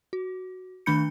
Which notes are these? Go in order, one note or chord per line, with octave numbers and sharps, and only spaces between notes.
F#4
D#3 A3 D4 B5 G6 C#7